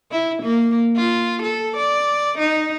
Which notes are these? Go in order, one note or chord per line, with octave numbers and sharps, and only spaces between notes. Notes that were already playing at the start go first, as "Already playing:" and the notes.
E4
A#3
F4
A4
D5
D#4